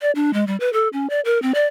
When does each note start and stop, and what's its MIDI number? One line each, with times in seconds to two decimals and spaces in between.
0.02 0.11 74
0.15 0.33 62
0.33 0.46 56
0.47 0.56 55
0.60 0.71 71
0.73 0.88 69
0.93 1.07 61
1.10 1.20 74
1.25 1.41 70
1.42 1.52 60
1.54 1.66 74